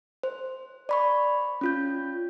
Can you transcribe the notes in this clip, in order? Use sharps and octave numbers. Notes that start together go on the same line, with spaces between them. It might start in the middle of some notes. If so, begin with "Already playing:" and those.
C5
D5 B5 C#6
C#4 F4 G6